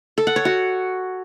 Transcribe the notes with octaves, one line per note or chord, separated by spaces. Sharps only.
A4
F#5
C#5
F#4